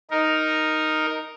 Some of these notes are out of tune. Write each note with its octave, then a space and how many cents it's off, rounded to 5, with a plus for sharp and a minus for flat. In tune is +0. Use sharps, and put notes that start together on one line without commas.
D#4 +0 A#4 +0